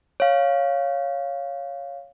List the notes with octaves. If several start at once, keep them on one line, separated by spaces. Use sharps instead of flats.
C#5 F5